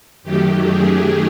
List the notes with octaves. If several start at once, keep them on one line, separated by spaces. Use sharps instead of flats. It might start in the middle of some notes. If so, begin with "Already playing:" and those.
F#2 D#3 F#3 A3 G4
G#4